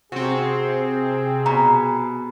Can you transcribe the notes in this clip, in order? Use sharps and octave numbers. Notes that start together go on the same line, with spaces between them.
C3 C4 F#4 G#4
B2 A#5